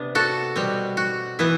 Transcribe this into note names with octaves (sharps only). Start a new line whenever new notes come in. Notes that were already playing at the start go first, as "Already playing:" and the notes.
Already playing: C3 B3 D4
F#4 A4
B2 G3 C4
F#4
E3 B3 E4